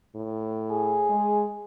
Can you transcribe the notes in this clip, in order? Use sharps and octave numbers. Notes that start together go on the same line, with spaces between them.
A2
G#4
G#3